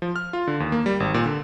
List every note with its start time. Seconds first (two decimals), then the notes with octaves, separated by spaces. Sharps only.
0.02 F3
0.16 F6
0.33 F4
0.47 D3
0.60 D#2
0.72 A#3
0.86 G3
1.00 G#1
1.14 A#2
1.26 D3